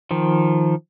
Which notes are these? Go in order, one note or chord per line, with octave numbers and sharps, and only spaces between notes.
D#3 F3